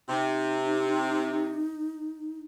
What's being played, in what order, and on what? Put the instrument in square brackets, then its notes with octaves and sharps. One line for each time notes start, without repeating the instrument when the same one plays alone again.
[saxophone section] C3 [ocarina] D#4